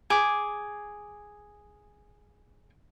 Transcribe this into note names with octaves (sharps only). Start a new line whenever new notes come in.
G#4 D6